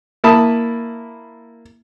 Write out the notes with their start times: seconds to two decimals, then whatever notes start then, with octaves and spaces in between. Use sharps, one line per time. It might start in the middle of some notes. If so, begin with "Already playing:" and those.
0.24 A#3 E4 A5 B5 D#6